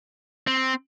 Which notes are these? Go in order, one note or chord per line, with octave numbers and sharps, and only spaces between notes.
C4